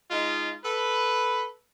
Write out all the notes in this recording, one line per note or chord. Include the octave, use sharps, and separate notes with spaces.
G#3 D#4 F4
A4 B4